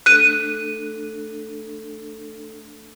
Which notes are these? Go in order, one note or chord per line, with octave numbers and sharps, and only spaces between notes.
A3 D4 A4 F#6 D#7